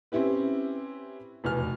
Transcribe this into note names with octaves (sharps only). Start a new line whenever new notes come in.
C4 C#4 E4 G4 B4
F1 E2 B2 F6